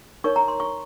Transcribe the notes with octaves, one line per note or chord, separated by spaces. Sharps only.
D#4 A#4 C#5 C#6
A#5
C6
C#6